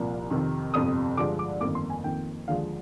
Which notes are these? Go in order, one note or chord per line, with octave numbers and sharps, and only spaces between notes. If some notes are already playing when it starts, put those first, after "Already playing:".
Already playing: C2 A#2 F3 A#3
F2 C3 D#3
G1 F2 C3 D#6
G2 D3 F3 G#3 D6
D6
G1 F2 D#3 A#3 D6
C6
G#5
F2 D#3 A#3 G5
D#2 D3 F3 G#3 F5